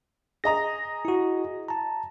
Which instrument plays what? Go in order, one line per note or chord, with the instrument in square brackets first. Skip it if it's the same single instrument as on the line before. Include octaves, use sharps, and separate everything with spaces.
[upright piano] G#4 D#5 A#5 [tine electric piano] A#6
[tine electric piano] E4 F#4
A5 A#5